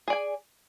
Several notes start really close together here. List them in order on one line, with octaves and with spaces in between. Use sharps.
G#4 D5 G#5